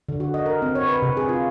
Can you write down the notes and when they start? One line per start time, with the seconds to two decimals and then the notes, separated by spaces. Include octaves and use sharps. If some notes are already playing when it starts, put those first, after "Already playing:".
0.09 D3
0.20 F#4
0.34 D#5
0.46 A#4
0.62 C4
0.75 C#5
0.89 B4
1.02 C3
1.17 G#4
1.29 F4